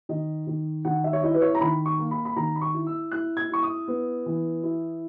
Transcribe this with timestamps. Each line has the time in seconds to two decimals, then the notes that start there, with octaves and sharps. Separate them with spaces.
0.09 D#3 D#5
0.47 D#3
0.85 D#3 F#5
1.04 E5
1.13 C#5
1.23 E4 D#5
1.34 B4
1.42 C#5
1.55 A#5
1.61 D#3 B5
1.86 C#6
1.99 A#3
2.11 B5
2.25 B5
2.36 D#3 A#5
2.56 B5
2.62 C#6
2.74 E4
2.87 E6
3.12 E4 F#6
3.37 G#6
3.50 E4 C#6
3.63 D#6
3.88 B3
4.26 E3
4.63 E4